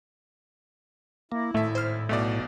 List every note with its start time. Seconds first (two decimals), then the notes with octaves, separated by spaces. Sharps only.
1.32 A#3 E4
1.54 G#1 A2 A3 E5
1.75 C5 F6
2.09 B1 B2 A3 D5